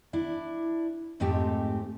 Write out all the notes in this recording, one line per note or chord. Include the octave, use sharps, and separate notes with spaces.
D4 E4
F2 G#2 A3 C4 D#4 G4